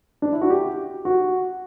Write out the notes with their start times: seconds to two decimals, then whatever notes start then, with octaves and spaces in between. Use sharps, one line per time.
0.22 D4
0.32 E4
0.42 F#4
0.50 G4
1.05 F#4